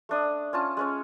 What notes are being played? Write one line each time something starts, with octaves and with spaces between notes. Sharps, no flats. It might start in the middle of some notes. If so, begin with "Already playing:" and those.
A3 D4 D#6
C#4 F4 A5
G#3 C#4 C#5